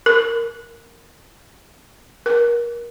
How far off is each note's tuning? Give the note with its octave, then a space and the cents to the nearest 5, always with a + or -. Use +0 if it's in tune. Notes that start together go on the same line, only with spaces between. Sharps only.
A#4 -10
A#4 +30